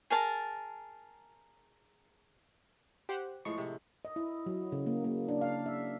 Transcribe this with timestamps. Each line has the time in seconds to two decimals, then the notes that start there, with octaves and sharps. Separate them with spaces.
0.10 G#4 A#4 A5 A#5
3.09 G4 C5 F#5
3.45 A2 F3 G#3 C#6
3.58 C3 C#4
4.05 D#5
4.16 E4
4.46 F#3
4.72 C#3
4.86 A#3
5.04 A#3
5.28 D4
5.41 F5
5.66 E5